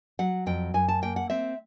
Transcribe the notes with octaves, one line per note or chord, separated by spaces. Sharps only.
F#3 F#5
F2 G5
F#2 G#5
A5
A#3 G5
F#5
C4 E5